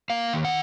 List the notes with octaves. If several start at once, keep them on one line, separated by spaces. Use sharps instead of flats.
A#3 F5
D#3
F#5